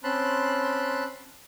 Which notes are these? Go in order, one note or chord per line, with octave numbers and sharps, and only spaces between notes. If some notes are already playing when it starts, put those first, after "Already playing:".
C4 C#4 A5 B5 C6 F#6